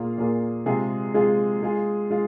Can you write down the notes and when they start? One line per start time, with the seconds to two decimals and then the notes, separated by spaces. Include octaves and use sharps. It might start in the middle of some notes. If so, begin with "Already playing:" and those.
Already playing: A#2 A#3 F4 G#4
0.18 A#2 A#3 F4 G#4
0.66 C3 G#3 F4 G#4
1.14 C3 G#3 F4 G#4
1.63 G#3 F4 G#4
2.11 G#3 F4